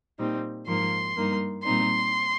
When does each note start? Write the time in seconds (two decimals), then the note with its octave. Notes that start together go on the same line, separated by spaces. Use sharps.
0.18 A#2 G3 C4 D#4
0.67 G#2 F3 A#3 D#4 C6
1.16 G2 G3 A#3 D#4
1.64 A#2 G3 C4 D#4 C6